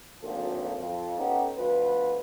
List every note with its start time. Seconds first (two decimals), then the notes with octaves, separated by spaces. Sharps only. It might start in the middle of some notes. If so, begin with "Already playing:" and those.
0.22 G#1 D2 F3 A#3 A4
0.78 F2
1.18 B3 C#4 D#4 G4 A4
1.57 D2 B2 F3 B4